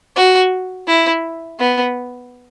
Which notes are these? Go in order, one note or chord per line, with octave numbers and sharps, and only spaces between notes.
F#4
E4
B3